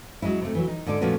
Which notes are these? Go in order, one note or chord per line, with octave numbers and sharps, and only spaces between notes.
F#3 G#3 C#4 E4
C3 A3
E3 F#3
D#4
G#2 D3 A4 D5
A#2 F3 A3 B3 C#4 F#4